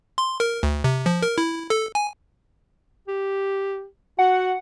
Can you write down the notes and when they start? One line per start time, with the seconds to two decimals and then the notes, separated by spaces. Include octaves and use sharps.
0.18 C6
0.40 A#4
0.63 D2
0.84 C3
1.06 F3
1.22 A#4
1.38 E4
1.70 A4
1.95 G#5
3.08 G4
4.19 F#4 F#5